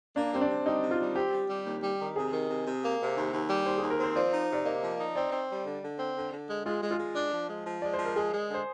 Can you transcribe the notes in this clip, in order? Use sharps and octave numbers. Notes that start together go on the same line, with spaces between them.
A#3 D4
G3 C4
D4
C3
G3 D#4
C3
F4
G3
C4 G4
G3
G3
D#2
G3
D#3
C3 G#4
D#3
C3
C3
A#3
C3
D#2
D#2
G3
D#2 C5
D#2 G#4
A#4
C4 C5
F3 D5
D#4
C3 D5
A#3 D#5
F3
D#4
C4 D5
C4
G3
D3
D3
C4
D3
D3
G#3
G#3 F4
G#3
F4
G#3
D4
F3
G#3
F3
G#3 D5
C5
F3
A#4
G#3 G#4
G#3
D3
C5